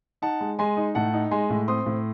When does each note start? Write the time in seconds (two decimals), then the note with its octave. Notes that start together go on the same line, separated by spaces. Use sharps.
0.22 D#4 F#5 A5
0.41 G#3
0.59 G#3 G#5 C6
0.77 D#4
0.95 A2 F#5 A5
1.13 D#4
1.31 G#3 G#5 C6
1.50 A2
1.68 C4 C6 D#6
1.86 A2